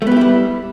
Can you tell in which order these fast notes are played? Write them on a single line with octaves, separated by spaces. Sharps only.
A3 B3 G4 E4 G3